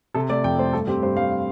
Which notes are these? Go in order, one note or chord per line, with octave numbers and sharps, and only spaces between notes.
C3 A4
A3 D5
F2 G5
A3 C5
G2 A4
C4 G4
G2 C5
G2 F5